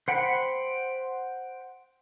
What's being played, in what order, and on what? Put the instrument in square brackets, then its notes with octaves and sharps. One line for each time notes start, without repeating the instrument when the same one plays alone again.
[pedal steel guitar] C5 F#5 G5 B5